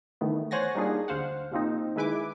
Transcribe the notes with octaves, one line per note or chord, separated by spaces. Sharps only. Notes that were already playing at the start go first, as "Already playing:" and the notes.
D#3 E3 A3 B3
C5 C#5 F#5 G#5 A6 A#6
G3 A#3 D4 D#4 F4 G#4
D2 C5 F5 F#5
C3 F3 A#3 C4 D#4
D#3 G#3 E4 B4 G#5 D6